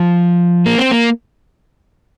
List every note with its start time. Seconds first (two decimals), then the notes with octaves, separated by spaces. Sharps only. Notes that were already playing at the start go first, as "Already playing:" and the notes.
Already playing: F3
0.66 A#3
0.78 C4
0.91 A#3